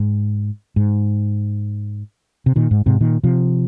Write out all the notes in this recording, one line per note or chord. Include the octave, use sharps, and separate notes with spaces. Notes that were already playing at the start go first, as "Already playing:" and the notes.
Already playing: G#2
G#2
C3
A#2 D#3
G#2
G#2 C3
A#2 D#3
C3 F3